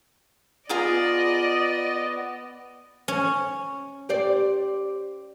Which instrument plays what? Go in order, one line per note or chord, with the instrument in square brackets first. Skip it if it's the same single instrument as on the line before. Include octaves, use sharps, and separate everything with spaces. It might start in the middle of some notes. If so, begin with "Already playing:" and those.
[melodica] B3 [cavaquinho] F4 G#4 A#5 [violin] D5 D#5
[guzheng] C#4
[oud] G4 C5 D5